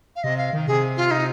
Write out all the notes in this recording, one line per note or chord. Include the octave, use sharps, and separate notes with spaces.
F5
C3 D#5
F5
D#3
C3 G#4
F4
D#4